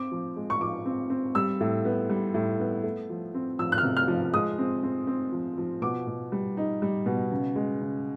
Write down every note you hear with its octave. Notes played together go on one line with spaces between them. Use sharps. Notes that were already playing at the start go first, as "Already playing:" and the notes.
Already playing: C4 D6
F3
G#3
C#6
F3 D6
C4
C4
G3 E6
A2
B3
G3
A2
B3
A3
F3
C4
F3 E6
F#6
F6
C3
F6
F3
G#3 D#6
C4
C4
C4
F3
F3
B2 D6
B2
G3
D#4
G3
B2
C#3
G#3
C#3